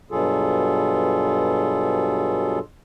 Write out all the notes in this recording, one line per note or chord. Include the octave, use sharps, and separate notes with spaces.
G2 B2 F#3 F4 G#4 A4